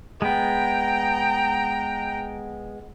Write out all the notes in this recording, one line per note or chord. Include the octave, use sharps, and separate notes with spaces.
G#3 B3 G5 A#5